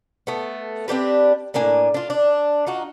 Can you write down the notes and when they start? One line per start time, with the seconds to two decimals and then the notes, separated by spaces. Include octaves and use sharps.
0.27 A3 B3
0.88 C4 D4 G4 B4
1.54 A2 A#3 D4 G#5
1.94 D4 F4
2.10 D4
2.67 D#4 F4 F#4